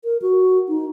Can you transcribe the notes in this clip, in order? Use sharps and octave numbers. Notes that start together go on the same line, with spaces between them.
A#4
F#4
D#4